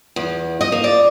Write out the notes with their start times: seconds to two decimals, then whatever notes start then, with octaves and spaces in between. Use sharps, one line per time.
0.16 E2
0.61 D#5
0.72 A#3
0.84 D5